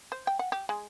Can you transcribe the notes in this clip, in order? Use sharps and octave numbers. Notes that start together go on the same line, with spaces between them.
C5
G5
F#5
G4
G#3